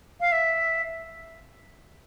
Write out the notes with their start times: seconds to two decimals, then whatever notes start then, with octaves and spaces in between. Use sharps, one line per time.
0.20 F5
0.32 E5